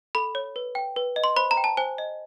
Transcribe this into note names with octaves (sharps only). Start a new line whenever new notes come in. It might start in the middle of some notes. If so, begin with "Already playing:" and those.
A4 B5
C#5
B4
G5
B4
D#5
C6
C5 B5
A#5
G5
A5
C5 G#5
D#5